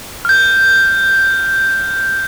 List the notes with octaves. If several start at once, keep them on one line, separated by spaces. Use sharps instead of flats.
F6 G6